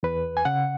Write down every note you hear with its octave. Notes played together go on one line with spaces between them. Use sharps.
E2 B4
G#5
C#3 F#5